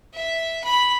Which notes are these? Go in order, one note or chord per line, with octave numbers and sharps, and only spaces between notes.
E5
B5